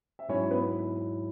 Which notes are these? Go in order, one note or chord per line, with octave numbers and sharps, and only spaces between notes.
E5
G#2 F#3 C#4 E4 C#5
B3 B4